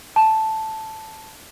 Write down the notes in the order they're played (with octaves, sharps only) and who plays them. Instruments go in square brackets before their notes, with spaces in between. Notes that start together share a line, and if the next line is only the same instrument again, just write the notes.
[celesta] A5